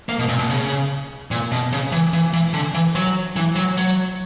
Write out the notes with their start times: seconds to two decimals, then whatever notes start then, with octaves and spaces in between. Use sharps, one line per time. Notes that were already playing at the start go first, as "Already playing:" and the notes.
0.09 A#3
0.19 B2
0.28 A#2
0.39 B2
0.50 C#3
1.31 A#2
1.52 B2
1.73 C#3
1.92 E3
2.13 E3
2.33 E3
2.53 D3
2.74 E3
2.95 F#3
3.36 E3
3.56 F#3
3.77 F#3